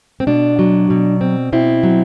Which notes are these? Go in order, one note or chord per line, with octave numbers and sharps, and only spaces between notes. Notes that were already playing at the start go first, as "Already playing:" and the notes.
C4
B2 D4
F#3
B2
C4
B2 C4 E4
F#3